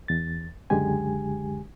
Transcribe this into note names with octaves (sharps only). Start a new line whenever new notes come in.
E2 A6
C#2 F#2 D3 G#3 G4 G#5